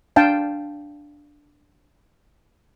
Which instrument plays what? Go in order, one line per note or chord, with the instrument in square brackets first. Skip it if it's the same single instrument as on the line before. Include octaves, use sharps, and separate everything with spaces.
[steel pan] D4 F5 G5 A5